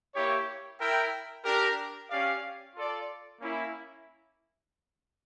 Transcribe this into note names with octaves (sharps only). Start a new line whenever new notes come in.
A#3 E4 G4 C#5
E4 A#4 E5 G5
D4 G4 A#4
C#4 G4 D5 F5
F4 A4 D5
A#3 C#4 E4